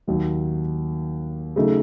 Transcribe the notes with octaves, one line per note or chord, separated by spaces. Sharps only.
D#2 D#3 F#3
C#3 F#3 A3 D#4